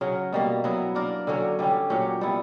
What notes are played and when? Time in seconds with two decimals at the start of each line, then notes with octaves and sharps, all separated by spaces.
0.01 C#3 F#3 C#4 F#4
0.32 B2 G3 A#3
0.64 F#3 B3 E4
0.95 A#3 D4 A#4
1.27 D3 F#3 C#4
1.59 D3 G3 C#4 G4
1.90 A#2 F#3 C#4 G4
2.21 G3 B3 E4